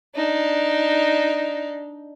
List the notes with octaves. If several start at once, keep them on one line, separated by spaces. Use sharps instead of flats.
D4 D#4